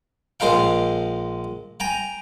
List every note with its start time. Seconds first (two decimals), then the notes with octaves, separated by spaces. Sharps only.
0.40 A#1 G#3 A#4 F5 G5
1.80 G5 G#5 A#5